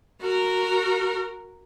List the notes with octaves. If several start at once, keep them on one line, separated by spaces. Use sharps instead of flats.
F#4 A#4